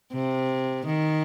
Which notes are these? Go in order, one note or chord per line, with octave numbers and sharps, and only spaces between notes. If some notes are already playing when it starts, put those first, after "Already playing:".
C3
D#3